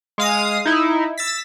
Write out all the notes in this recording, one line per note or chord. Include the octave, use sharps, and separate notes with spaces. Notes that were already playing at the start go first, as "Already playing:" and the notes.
G#3 F5 D#6
D#4 E4
E6 A6 B6